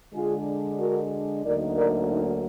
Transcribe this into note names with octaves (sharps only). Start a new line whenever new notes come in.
D3 G#3 D4 F4 G#4
F#4 A#4
D2 D3 F#3 A#3 D#4 A#4 D5
A#4 D5
D#4